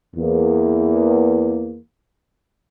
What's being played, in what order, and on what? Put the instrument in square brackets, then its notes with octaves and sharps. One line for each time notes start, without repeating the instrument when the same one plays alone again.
[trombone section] E2 A#3